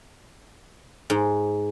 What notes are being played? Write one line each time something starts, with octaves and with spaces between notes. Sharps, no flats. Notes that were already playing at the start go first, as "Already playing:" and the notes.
G#2